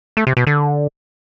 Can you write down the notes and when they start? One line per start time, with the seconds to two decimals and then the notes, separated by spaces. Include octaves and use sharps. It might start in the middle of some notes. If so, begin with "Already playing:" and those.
0.17 A3
0.27 C3
0.37 B2
0.47 D3